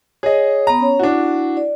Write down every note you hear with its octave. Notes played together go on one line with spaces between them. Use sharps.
G#4 C#5 D#5
B3 A#5 B5 D#6
C#4 C#5
D4 E4 F#4
D5